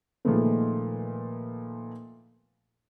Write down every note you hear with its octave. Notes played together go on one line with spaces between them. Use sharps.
A#2 D#3 F3 G#3 A3 B3